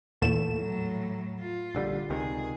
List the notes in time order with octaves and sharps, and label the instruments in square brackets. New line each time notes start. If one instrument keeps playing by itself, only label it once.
[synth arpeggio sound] E2 A#2 E7 [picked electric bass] A3
[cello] A2 F#3
F4
[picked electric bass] A#1 D3 G3
[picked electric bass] C#2 C3 D#3 [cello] G#4